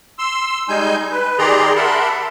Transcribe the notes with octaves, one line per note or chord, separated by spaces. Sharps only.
C6 E6
G3 G#3 D#4 G#5 G6
B4
D#3 G4 G#4 D5 A#5 C6
A#4 E5 F#5 A5 B5 C6